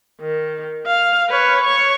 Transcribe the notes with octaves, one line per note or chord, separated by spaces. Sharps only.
D#3
F5
B4 C#5
C#5 C#6